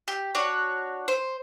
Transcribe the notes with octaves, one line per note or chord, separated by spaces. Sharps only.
G4
D4 F#4 C#5
C5